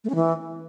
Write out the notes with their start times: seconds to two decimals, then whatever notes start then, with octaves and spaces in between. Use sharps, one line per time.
0.04 A3
0.10 C#4
0.15 E3